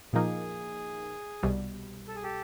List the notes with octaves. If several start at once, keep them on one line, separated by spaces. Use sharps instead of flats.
A#2 F3 A#3 D#4 G#4
C2 B2 G3
A4
G#4
G4 A4